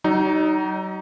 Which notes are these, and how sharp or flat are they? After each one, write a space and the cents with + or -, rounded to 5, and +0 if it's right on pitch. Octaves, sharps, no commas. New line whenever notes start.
F#3 +40 D#4 +0